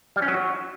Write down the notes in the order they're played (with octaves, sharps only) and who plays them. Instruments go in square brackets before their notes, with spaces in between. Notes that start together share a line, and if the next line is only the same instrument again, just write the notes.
[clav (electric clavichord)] G3
C#4
F#3
F#4